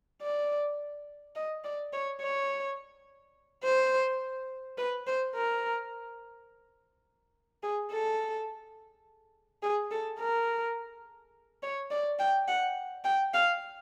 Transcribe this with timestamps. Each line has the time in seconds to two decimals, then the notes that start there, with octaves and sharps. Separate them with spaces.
0.22 D5
1.35 D#5
1.64 D5
1.93 C#5
2.21 C#5
3.64 C5
4.78 B4
5.07 C5
5.35 A#4
7.63 G#4
7.91 A4
9.63 G#4
9.91 A4
10.19 A#4
11.63 C#5
11.90 D5
12.19 G5
12.48 F#5
13.04 G5
13.34 F5